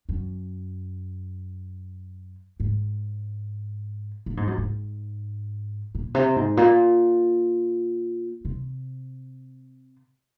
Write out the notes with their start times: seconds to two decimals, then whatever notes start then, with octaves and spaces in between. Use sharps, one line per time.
0.09 F#2
2.60 G#2
4.26 A#2
4.37 G#2
4.47 F#2
4.58 G#2
5.95 A#2
6.15 C3
6.36 G#2
6.57 A#2
8.45 C3